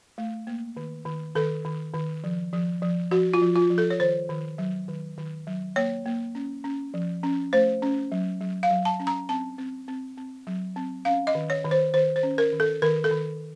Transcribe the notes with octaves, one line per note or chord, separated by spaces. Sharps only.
A3
A#3
D#3
D#3
D#3 A4
D#3
D#3
F3
F3
F3
F3 F#4
F4
F3
F4
F3
A4
C#5
D#3 C5
D#3
F#3
D#3
D#3
F#3
A#3 C#5
A#3
C#4
C#4
F3
C#4
A3 C5
C#4
F#3
F#3
F5
F#3
A5
C#4
A#5
C4 A5
C4
C4
C4
F#3
C4
C#4 F5
D#5
D#3
C#5
D#3
C5
D#3 C5
C5
C#4
A#4
D#3
A4
D#3 A#4
A4
D#3